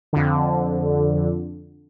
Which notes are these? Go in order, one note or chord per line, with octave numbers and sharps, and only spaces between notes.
F2 D3